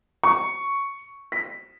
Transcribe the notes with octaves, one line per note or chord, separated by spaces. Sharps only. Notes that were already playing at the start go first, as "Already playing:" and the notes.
C#6
B6